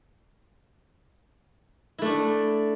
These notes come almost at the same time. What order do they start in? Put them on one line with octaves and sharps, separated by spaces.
E4 A3 D4